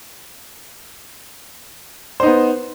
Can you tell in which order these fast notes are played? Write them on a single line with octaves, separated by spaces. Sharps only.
C5 D#4 B3